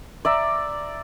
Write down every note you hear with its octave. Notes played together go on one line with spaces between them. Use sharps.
D5 E5 A#5